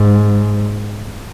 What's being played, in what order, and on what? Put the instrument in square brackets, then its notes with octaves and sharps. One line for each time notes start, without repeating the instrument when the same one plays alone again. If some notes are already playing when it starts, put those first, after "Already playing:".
Already playing: [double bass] G#2